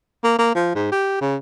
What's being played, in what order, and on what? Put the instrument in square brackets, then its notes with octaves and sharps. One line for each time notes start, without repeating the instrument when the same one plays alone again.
[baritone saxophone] A#3
A#3
F3
G#2
G4
C#3